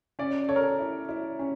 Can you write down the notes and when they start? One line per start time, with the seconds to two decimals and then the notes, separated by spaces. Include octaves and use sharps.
0.19 C#4 D5
0.49 A4 C#5
0.56 A#4
0.63 C#5
0.79 E4
1.09 E4
1.39 C#4